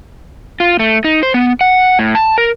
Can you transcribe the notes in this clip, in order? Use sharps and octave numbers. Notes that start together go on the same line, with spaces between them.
F4
A3
D#4
C5
B3
F#5
A2
A5
A#4